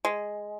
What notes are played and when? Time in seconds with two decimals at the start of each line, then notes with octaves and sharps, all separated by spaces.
0.05 G#3